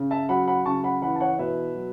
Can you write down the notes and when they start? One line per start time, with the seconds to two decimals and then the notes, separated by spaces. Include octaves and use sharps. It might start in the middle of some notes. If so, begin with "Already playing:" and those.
Already playing: C#3
0.11 E5 A5
0.29 F#3 F#5 B5
0.47 F#5 B5
0.65 C#3 A5 C#6
0.84 F#5 B5
1.02 E3 F#5 B5
1.16 A5
1.20 C#5 F#5
1.39 B2 B4 E5
1.75 F#3